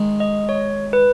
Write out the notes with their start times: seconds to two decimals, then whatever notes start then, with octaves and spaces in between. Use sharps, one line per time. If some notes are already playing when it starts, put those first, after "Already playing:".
Already playing: D#3 G#3
0.20 D#5
0.49 C#5
0.93 B4